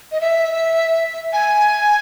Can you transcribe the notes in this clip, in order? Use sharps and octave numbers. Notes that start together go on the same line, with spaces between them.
D#5
E5
G#5